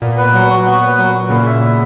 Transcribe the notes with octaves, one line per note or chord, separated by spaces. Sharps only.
A#2 B3
B4
F#3
F#4
B3
B4
F#3
F#4
A#2 C#3 E4
E5
B3